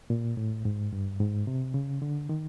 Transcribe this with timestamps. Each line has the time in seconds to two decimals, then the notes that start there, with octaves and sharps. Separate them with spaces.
0.10 A#2
0.37 A2
0.65 G#2
0.93 G2
1.20 G#2
1.47 C3
1.74 C#3
2.02 D3
2.29 D#3